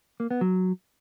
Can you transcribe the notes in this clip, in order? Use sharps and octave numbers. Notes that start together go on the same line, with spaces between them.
A#3
B3
F#3